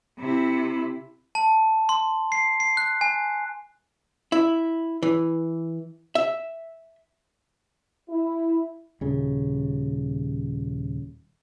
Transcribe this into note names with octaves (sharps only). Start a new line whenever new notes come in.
C3 E4
A5
C6
C7
C7
F#6
G#5
E4
E3
E5
E4
D#1 C#3